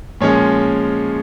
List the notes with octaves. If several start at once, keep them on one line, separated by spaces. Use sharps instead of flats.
A#2 F3 G#3 C#4 C#5